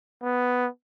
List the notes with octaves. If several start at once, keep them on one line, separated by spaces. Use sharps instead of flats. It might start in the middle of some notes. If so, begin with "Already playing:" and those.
B3